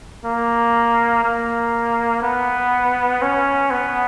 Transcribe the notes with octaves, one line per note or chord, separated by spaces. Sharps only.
A#3
A#3
B3
C#4
B3